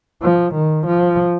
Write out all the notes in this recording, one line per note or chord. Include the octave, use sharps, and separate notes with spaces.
F3
D#3
F3